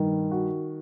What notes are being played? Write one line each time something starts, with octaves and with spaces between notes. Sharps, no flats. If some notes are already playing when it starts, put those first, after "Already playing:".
Already playing: G2 D#3
F#4